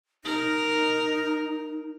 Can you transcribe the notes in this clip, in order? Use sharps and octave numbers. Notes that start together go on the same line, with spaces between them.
D#4 A#4